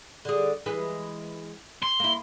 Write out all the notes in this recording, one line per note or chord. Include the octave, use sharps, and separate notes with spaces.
D3 G#4
E3 G#3 B4
C6
A#3 E4